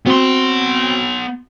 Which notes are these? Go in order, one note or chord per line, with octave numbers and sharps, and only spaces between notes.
B3 C4 F#4 C6